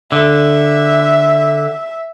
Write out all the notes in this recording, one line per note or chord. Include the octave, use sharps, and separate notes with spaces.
D3 E5